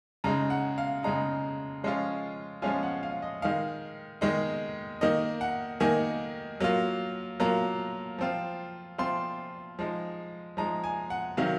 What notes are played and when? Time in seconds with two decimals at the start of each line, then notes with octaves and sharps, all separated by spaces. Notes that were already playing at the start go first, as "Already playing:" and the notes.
0.24 C#3 G#3 D#4 A#5
0.50 F#5
0.78 F5
1.03 C#3 G#3 D#4 A#5
1.83 F3 G#3 C#4 F4
2.62 F3 G#3 C#4 F4 G#5
2.83 F#5
3.03 F5
3.22 D#5
3.42 D#3 G#3 D#4 F5
4.21 D#3 G#3 D#4
5.01 D#3 A#3 D#4 D#5
5.41 F#5
5.80 D#3 A#3 D#4 G#5
6.60 F#3 A#3 F4
7.40 F#3 A#3 F4 A#5
8.18 F3 C4 F4
8.98 F3 C4 F4 C6
9.79 F3 G#3 D#4
10.57 F3 G#3 D#4 A#5
10.84 G#5
11.10 F#5
11.37 C3 D#3 F#3 F5